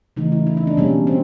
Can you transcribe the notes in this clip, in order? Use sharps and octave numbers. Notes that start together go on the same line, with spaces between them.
C#3 E3 A3 D#4
E4
E4
D#4
D4
B2 G3 A#3 C#4
C4